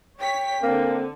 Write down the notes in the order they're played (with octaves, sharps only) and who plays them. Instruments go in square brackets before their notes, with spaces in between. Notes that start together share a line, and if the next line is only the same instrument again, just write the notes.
[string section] C#5 B6 [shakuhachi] G5
[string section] D3 [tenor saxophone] A#3 [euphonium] C4